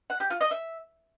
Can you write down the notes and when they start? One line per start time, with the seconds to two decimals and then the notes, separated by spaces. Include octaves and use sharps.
0.10 F#5
0.20 G4
0.30 F4
0.41 D#5
0.51 E5